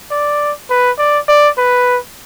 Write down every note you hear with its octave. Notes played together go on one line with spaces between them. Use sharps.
D5
B4
D5
D5
B4